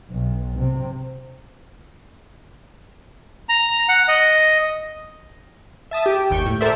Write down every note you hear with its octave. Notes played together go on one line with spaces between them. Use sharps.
B1
C3
A#5
F#5
D#5
E5 A5 D#6
G4
G1 D#2 G5 C#6
A2
A4 A#4 C5 D5 E5